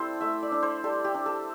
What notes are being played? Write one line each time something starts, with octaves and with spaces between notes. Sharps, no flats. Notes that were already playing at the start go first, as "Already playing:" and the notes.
Already playing: G3 C4 E4 A4 C5
A3 E5
D5
D4
C5
G3 A4
G4
D4
A4